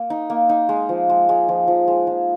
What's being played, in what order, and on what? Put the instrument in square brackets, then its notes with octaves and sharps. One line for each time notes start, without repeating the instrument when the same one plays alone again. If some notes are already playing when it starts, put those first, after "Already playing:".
Already playing: [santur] A#3
D#4
A#3
D#4
G#3
F3
G#3
G#3
F3
F3
G#3
F3